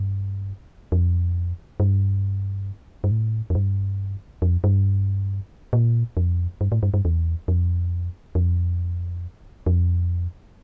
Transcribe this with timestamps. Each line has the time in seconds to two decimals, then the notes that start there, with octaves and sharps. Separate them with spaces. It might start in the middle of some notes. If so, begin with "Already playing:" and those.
Already playing: G2
0.92 F2
1.80 G2
3.04 G2
3.11 A2
3.50 F2
3.55 G2
4.42 F2
4.64 G2
5.73 A#2
6.17 F2
6.61 G2
6.72 A2
6.83 G2
6.94 G2
7.05 E2
7.48 F2
8.35 F2
9.66 F2